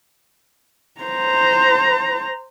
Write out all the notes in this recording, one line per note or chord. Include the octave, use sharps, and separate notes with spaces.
C5 A#5